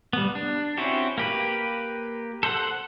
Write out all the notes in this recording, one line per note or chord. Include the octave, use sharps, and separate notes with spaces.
G3 B3
D4
C4 C#4 E4 F#4 G4
A#3 G4 B4
A4 C5 D#5 F#5